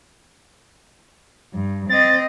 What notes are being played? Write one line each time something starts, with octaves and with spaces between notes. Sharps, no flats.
G2
C4 D#5 A6